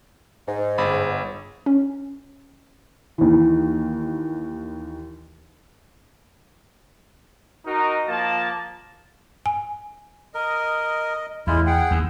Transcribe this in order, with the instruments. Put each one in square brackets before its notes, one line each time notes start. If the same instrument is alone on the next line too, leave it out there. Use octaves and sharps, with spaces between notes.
[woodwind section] G#2
[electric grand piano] G1 B5
[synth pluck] C#4
[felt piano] D#2 E3
[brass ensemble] D#4 F#4 A#4 D#5
F3 A#3 A5
[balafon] G#5
[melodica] A#4 [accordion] D#5
[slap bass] E2 [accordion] A2 [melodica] G#3 E4 F4
[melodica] G#4 [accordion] F#5 G5
[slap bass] D#2